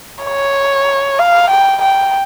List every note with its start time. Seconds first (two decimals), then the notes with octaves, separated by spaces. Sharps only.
0.24 C#5
1.19 F5
1.50 G5
1.82 G5